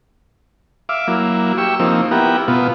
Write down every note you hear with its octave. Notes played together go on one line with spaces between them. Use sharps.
E5 F5 D6
F#3 A#3 E4
G4 C#6 E6
F3 A#3 C4 D#4
B3 E4 G4 A#4 F#5
B2 B3 F4